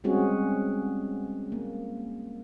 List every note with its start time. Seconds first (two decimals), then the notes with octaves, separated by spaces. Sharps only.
0.04 G3 G#3 C4 C#4 F#4 G#4
1.52 A#3